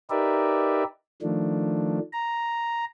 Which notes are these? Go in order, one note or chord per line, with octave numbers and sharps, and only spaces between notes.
D#4 G4 A#4 B4 D5 E5
D#3 F3 A3 D4
A#5